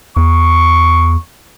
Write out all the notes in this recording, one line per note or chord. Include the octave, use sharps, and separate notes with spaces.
E2 C#6